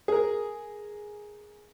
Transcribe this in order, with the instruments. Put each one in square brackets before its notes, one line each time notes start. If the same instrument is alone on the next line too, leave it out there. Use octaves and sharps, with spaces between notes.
[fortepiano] G#4 A#4